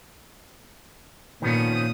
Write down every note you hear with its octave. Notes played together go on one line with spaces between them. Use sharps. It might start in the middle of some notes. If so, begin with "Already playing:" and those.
A#2 D#3 F3 B3 C#4 D#6